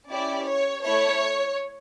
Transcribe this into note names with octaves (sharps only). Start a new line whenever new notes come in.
C#4 E4 G4 D5
C#5
A3 E4 A4 C#5